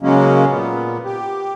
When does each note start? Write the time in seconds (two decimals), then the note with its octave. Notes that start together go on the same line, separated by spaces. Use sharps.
0.02 C#3 F#3 G#3 A#3 C#4
0.50 A#2 B3
1.05 G4